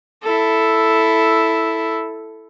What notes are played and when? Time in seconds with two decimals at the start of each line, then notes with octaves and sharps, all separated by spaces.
0.23 E4 A4